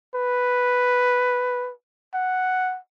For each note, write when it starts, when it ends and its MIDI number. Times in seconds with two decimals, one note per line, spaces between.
0.15 1.71 71
2.14 2.78 78